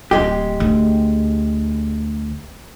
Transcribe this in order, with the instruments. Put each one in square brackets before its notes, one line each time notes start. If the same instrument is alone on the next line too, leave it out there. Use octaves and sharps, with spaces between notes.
[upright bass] D1 [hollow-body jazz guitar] G#3 G4
[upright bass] D2